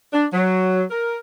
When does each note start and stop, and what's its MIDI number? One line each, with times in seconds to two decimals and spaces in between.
0.13 0.26 62
0.33 0.83 54
0.91 1.18 70